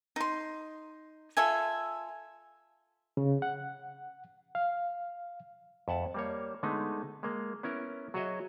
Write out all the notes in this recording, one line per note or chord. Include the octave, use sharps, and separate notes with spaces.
D#4 C6
F4 A4 E5 G#5
C#3
F#5
F5
F2 E5 F#5 A5
G3 A#3 C#5
D3 G#3 A3 B3 D#4
G#3 A#3
B3 C#4 E4 A#4
F#3 F#4 G#4 C#5 D#5 E5